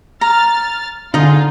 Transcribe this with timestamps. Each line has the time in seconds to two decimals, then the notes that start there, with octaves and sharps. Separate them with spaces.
0.21 A#5 F6 A6
1.14 D3 D#4 F4 G#4 D#5